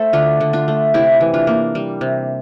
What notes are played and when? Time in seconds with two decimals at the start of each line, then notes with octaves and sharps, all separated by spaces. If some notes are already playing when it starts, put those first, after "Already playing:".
Already playing: A3 A4 C5
0.13 D3 D4 F4
0.40 D3
0.53 D4 F4
0.68 A3
0.94 C3 E4 G4
1.21 E3
1.34 D4 F4
1.47 A#3
1.75 G3
2.01 C3